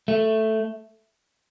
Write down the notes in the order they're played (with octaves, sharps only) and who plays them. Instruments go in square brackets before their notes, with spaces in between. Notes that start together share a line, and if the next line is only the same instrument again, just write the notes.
[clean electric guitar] A3